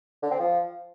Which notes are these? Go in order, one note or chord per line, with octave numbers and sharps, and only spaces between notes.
D3
C4
F3